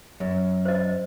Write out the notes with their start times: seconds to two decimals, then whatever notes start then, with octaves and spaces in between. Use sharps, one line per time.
0.20 F#2
0.65 C5 D#5